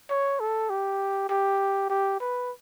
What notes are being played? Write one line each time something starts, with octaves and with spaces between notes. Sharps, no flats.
C#5
A4
G4
G4
G4
B4